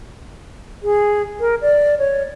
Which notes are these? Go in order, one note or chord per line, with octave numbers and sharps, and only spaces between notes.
G#4
A#4
D5
C#5